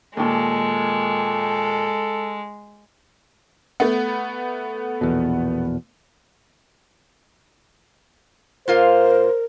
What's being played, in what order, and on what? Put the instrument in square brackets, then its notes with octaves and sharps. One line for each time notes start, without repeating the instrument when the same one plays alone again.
[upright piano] D#2 A#2 [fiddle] G#3 [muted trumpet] A4
[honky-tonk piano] A3 B3
[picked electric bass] A#1 E2 B2
[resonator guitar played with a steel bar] A#2 F4 F5 [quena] A#4 [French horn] C5